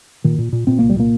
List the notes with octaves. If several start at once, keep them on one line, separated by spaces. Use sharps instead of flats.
A#2 D#3
A#2
A#2
A#2 C4
C2 A#3
G3
A#2 A#3